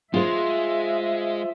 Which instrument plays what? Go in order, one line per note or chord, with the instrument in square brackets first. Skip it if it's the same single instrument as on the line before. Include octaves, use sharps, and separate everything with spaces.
[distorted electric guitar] G#3 [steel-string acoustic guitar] F4 C5 [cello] E5